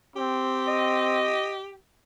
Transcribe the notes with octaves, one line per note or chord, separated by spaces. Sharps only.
C4 G4
D#5